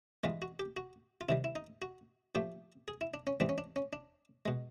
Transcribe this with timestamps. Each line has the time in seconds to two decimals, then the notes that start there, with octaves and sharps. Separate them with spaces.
0.24 G2 E3 G#3 B3 F4
0.42 F#4
0.59 G4
0.77 F#4
1.21 F4
1.29 C3 D#3 G3 E4
1.44 E4
1.56 D#4
1.82 F#4
2.35 A#2 F3 A3 G4
2.88 G#4
3.01 E4
3.14 D4
3.27 C#4
3.40 G#2 E3 G3 C4 D4
3.49 C#4
3.58 D4
3.76 C#4
3.93 D4
4.46 B2 G#3